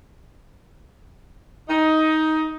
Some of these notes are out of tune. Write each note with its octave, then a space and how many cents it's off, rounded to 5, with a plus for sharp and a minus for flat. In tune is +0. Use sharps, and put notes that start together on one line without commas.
D#4 +15